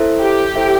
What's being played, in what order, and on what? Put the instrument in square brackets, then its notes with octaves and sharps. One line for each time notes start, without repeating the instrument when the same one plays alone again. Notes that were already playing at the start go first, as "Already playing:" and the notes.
Already playing: [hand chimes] E4 A4 C5 E5
[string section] G4
[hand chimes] E4 A4 C5 E5